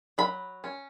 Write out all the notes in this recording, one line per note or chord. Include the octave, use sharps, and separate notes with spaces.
F#3 B5
C#4